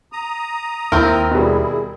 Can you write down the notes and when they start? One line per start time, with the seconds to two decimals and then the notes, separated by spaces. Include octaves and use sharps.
0.12 A#5 D#6
0.92 D#2 C4 E4 A#4
1.31 B2 G3 E4 G#4